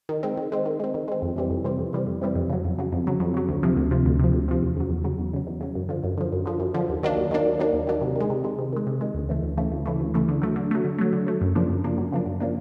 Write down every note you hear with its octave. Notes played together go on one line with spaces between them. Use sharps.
D#3
G#3 C4
D#3
G#3 C4
D#3
G#3 C4
D#3
G#3 C4
F2
C3 E3 G3 C4
F2
C3 E3 G3 C4
F2
C3 E3 G3 C4
F2
C3 E3 G3 C4
F2
C#3 F#3
F2
C#3 F#3
F2
C#3 F#3
F2
C#3 F#3
D2
C3 F3
D2
C3 F3
D2
C3 F3
D2
C3 F3
E2
C#3 F#3
E2
C#3 F#3
E2
C#3 F#3
E2
C#3 F#3
F#2
D3 F3
F#2
D3 F3
F#2
D3 F3
F#2
D3 F3
D#2
D#3 F#3 A#3 D4
D#2
D#3 F#3 A#3 D4
D#2
D#3 F#3 A#3 D4
D#2
D#3 F#3 A#3 D4
C3
D#3 G#3
C3
D#3 G#3
C3
D#3 G#3
C3
D#3 G#3
D2
C#3 E3 A3
D2
C#3 E3 A3
D2
C#3 E3 A3
D2
C#3 E3 A3
D3
F#3 A3
D3
F#3 A3
D3
F#3 A3
D3
F#3 A3
F#2
C#3 F3 A#3 D4
F#2
C#3 F3 A#3 D4
F#2
C#3 F3 A#3 D4
F#2
C#3 F3 A#3 D4